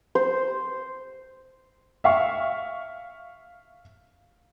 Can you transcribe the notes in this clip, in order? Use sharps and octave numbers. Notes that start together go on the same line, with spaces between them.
C5
E5 F5 C#6